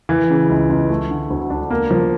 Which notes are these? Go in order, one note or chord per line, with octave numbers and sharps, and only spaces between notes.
E3
C#3
C#2
C#2
A3
D3
D2
D4
A#3
F3